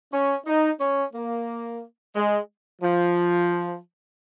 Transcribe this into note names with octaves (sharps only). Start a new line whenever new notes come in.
C#4
D#4
C#4
A#3
G#3
F3